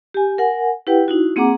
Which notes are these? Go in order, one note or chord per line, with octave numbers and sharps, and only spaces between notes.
G4 G#5
A#4 F#5 G#5
E4 G4 B4 F#5 G5
D#4 E4 F#4
A#3 C4 G#4 F#5 A#5 D6